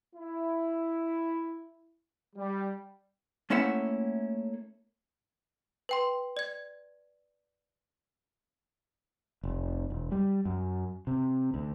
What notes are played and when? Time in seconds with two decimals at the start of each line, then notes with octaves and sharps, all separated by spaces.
0.16 E4
2.35 G3
3.50 A3 A#3 C#4 E4 E5 F#5
5.89 B4 G5 C6
6.37 D5 G#6
9.43 F1
9.90 E1
10.12 G3
10.45 F#2
11.07 C3
11.54 D2